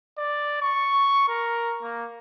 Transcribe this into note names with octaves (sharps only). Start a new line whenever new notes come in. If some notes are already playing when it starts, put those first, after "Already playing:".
D5
C#6
A#4
A#3